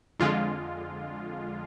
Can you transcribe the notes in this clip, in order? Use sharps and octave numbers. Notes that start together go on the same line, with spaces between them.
F2 D3 G#3 F4